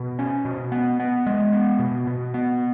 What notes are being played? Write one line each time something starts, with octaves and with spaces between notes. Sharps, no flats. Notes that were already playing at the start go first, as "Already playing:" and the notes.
Already playing: B2
C#4
B2
B3
B3
G#3
B3
B2
B2
B3